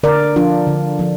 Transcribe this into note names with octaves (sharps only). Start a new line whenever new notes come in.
D3 A#4 D5
F3 D4 F4
D3
F3 D4